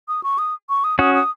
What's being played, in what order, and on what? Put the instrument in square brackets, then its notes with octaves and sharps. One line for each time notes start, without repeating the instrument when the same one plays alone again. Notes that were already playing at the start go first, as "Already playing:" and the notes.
[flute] D#6
C#6
D#6
C#6
D#6
[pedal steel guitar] C#4 F#4 [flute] D#6
[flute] D#6